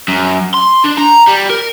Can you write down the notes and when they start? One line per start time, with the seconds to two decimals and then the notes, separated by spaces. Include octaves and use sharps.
0.08 F#2
0.54 C6
0.84 D4
0.98 A#5
1.28 G3
1.50 A#4